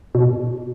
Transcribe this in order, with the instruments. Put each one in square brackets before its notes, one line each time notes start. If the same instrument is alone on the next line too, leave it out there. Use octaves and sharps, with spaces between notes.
[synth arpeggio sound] B2